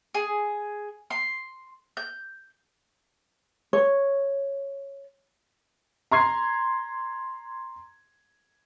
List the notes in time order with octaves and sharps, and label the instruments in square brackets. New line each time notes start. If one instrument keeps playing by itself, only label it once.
[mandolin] G#4
C6
G6
[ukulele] C#5
[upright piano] A#5 C6 G#6 C7